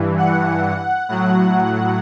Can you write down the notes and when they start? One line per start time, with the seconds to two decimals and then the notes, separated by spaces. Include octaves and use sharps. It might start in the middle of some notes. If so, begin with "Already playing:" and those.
Already playing: G2 E3
0.18 F#5
1.09 A2 F#3 F#5